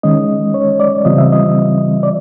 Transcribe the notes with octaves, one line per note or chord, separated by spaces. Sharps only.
D#3 G#3 C#4 D#5
C#5
D5
C#3 E3 G3 C4 F4 D#5
E5
D#5
D5